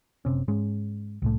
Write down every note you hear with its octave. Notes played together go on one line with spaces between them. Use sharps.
F#1 C3 C#4
G#2 G#3 C#4
C2 A2 A3